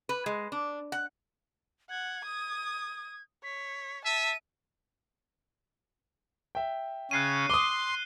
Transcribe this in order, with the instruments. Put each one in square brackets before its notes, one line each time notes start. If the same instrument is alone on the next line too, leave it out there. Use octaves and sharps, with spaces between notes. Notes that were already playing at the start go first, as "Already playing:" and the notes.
[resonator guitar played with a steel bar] B4
G#3
D4
F#5
[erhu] F#5 [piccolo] G#6
[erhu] D#6
[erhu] C#5 [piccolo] B6
[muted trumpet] E5 [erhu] A5 [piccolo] D#7
[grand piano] E5 G5
[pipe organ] C#3 C#4 [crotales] F#6 C7 D#7
[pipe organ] C6 [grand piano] D6 D#6 [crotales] G7